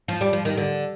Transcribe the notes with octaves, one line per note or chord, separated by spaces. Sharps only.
F3
G3
F3
D#3
D3